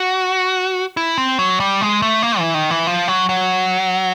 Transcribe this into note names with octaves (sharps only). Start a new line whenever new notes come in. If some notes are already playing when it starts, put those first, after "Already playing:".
Already playing: F#4
E4
C4
F#3
G3
G#3
A3
A#3
E3
D#3
E3
F3
F#3
F#3